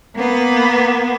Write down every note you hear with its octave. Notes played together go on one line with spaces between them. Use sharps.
A#3 B3